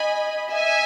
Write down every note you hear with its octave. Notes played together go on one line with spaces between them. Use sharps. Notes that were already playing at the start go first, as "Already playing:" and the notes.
Already playing: D#5 G#5 B5
D#5 E5 G#5